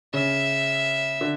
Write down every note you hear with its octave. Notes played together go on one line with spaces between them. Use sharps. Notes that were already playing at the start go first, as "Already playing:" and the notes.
C#3 E5
D3